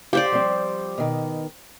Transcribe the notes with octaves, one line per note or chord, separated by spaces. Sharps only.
G4 C5 D5 F5
F3 G3 C4
B2 D#3